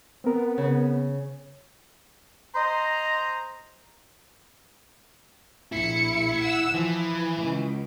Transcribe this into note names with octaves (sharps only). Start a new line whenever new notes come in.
B3 C4 A#4
C#3
C5 D#5 A#5
A#1 E4 C#7
F#5 E6
E3 F3
C#2